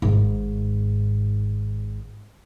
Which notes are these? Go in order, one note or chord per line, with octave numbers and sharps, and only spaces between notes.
G#1 G#2